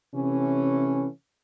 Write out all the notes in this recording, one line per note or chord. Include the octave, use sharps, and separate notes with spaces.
C3 E3 A3 C#4